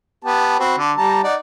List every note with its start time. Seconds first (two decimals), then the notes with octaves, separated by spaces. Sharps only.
0.25 B3 G4 A5
0.59 C4 F#4 B5
0.78 D3
0.97 G3 A5 A#5
1.23 D#4 D5 F#5